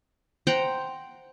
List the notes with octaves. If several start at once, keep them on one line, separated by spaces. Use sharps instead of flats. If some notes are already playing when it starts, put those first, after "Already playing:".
C5 F#5 G5 A#5